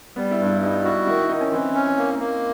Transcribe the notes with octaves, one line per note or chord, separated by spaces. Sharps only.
G3 B3
E4
G2
E4
G3 D#4
E4 F#4
D#3 E4
D#4
D#3 D#4
C#4
E3 C4
C#4
A#3
A#3